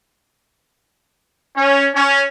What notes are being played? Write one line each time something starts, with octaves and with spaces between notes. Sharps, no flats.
C#4
C#4